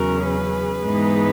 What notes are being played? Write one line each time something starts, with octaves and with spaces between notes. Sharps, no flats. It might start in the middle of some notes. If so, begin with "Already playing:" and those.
Already playing: E2 C#3 F#3 C#4 F#4 A#4
G#4 B4
G#2 E3 G#3 B3 D#4